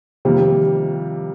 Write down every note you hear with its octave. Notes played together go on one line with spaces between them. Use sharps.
F2 C3 D#3 G3 A#3